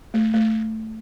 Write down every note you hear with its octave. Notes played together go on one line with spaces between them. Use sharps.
A3
A3